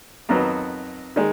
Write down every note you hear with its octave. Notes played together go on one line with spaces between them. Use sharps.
F2 D#3 F#3 B3
D#3 G#3